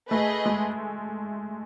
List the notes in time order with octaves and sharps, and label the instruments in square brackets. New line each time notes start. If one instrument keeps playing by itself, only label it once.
[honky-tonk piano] A3 [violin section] G#4 B4 D#5
[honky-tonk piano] G#3